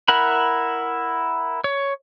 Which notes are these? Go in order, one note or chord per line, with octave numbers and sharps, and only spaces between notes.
E4 A#4 F#5 B5
C#5